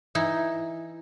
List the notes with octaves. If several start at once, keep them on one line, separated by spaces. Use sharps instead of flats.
E3 D#4 E4